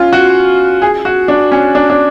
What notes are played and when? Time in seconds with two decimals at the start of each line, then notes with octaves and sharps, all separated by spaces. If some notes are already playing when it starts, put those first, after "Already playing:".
Already playing: C#4 F4
0.13 F#4
0.82 G#4
1.05 F#4
1.28 D4
1.52 C#4
1.75 D4
1.90 D4